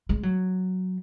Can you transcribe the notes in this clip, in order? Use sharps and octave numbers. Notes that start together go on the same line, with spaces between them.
G#3
F#3